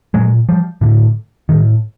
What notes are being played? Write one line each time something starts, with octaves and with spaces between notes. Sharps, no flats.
A#2 F#3 G#3
F3 G3
A2 D3
A2 D#3